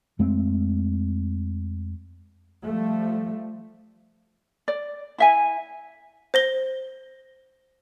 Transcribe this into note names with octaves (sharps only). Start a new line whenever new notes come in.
F2 G#3 A3 C4
F3 G3 A3
D5
E4 E5 G#5
C5 A#6 G7